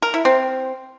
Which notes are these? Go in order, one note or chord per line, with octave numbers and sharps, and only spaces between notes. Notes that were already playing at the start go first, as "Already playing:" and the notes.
A#4
E4
C4